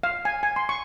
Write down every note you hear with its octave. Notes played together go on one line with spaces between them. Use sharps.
F5
G#5
G#5
C6
C#6